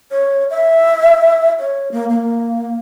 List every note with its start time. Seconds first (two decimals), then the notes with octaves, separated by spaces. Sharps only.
0.12 C#5
0.50 E5
1.59 C#5
1.92 A#3
2.10 A#3